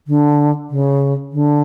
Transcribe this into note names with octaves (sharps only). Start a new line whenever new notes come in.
D3
C#3
D3